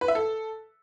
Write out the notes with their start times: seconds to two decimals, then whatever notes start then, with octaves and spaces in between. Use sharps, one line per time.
0.01 B4
0.08 E5
0.15 A4